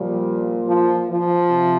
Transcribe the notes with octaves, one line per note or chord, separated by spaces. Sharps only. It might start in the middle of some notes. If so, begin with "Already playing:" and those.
Already playing: A#2 F3 G3
F3
F3
C3